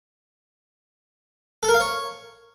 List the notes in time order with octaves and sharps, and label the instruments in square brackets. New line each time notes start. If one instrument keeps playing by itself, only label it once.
[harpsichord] A4
A#4
F5
C#5